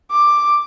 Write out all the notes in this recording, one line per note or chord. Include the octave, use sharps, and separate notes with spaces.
D6